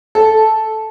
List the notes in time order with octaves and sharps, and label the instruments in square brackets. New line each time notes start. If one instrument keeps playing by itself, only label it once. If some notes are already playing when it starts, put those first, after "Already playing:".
[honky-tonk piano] A4